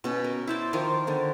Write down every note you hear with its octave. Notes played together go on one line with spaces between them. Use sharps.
B2 C#4
A#4
E4 C5 D5
D#3 F3 F4 A#4
D3 D#3 A#4